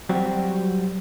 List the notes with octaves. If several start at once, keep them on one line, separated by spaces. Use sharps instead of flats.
F#3 G3 C4 F#4